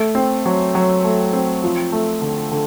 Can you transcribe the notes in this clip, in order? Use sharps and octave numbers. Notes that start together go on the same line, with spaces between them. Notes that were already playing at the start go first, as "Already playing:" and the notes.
Already playing: A3
C4
F#3
F#3
A3
C4
F3
A3
D3
D3